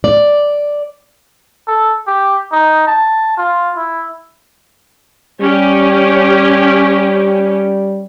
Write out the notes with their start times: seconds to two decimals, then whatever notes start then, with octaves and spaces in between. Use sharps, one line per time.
0.04 D5
1.68 A4
2.08 G4
2.52 D#4
2.87 A5
3.37 F4
3.77 E4
5.41 G3 C#4 G4